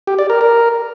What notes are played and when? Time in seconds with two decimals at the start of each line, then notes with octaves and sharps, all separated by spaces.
0.07 G4
0.19 D5
0.30 A#4
0.41 A#4